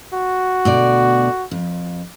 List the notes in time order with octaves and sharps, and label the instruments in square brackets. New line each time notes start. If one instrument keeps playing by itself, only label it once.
[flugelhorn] F#4
[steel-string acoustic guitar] D2 B2 D5
F2